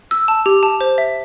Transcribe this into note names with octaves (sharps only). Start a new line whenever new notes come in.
E6
A5
G4
A5
C5
E5